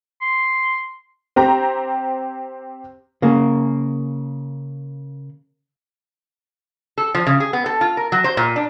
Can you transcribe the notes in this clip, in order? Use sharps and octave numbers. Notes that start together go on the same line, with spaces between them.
C6
C4 G4 A#5
C#3 A#3
A4
F3
C#3
G#4
B3
A4
F4
A#4
F#3
C5
A#2
D4